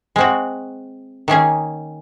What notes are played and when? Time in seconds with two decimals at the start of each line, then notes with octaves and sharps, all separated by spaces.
0.16 G#3 C4 F#4
1.28 D#3 A#3 C#4 G#4